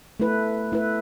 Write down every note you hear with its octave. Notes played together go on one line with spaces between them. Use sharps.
A3 E4 B4
A3 E4 B4